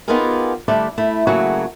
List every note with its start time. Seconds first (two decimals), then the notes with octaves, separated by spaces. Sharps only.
0.08 B3 D#4 F4 G4 G#4 A#4
0.68 D3 G3 A3 D4 E4
0.98 A3 E4
1.27 C#3 F#3 A3 A#3 F#4 G#4